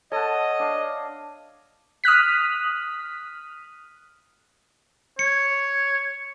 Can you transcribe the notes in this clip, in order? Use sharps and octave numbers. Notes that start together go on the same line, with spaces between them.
A4 C#5 D#5 F#5 A5
D4 F5
D#6 F6 F#6 B6
C#5 C#7